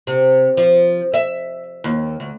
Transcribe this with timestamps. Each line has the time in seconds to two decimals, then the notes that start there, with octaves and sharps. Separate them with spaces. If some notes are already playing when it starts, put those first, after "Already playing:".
0.07 C3
0.57 F3
1.14 E5
1.84 D#2
2.20 D2